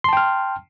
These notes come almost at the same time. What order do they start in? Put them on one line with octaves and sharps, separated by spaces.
C6 A5 G5 F6